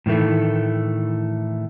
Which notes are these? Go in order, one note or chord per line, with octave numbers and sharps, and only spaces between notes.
A2 D#3 E3 A3